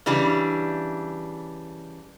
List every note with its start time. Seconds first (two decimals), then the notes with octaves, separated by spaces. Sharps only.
0.06 C#3 E3 G3 D4